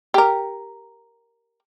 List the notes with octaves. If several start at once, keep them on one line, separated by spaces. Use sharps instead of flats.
G4 A#4